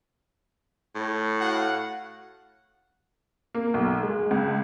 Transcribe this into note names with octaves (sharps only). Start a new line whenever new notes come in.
A2
F#4 F5 F#5
A#3
B1
G#3
C#2